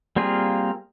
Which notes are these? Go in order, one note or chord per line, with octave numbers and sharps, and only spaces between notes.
G3 A#3 C4 F4 G#4